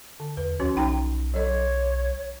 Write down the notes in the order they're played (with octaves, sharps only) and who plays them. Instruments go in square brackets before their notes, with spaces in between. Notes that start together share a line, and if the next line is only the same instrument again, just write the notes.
[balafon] D3
[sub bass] E2 [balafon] B4
[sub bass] D2 [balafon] F3 C#4 F#4
[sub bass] B1 [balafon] D#4 G5 A#5
[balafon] F#3 A4 D#5 [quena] C#5